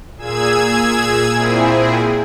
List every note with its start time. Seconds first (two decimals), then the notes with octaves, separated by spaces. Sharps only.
0.17 A#2 G#4 E6 G#6
1.34 A#2 C4 E4 G#4